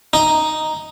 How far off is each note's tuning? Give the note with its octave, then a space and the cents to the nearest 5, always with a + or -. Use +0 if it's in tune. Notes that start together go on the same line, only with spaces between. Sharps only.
D#4 +0